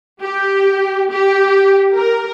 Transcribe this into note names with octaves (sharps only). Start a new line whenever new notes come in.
G4
G4
A#4